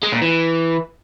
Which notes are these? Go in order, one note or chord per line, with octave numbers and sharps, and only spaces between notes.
G#3
A#2
E3